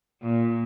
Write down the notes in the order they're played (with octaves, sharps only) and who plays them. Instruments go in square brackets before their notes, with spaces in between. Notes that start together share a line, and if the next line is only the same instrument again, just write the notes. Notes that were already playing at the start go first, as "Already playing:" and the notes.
[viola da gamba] A#2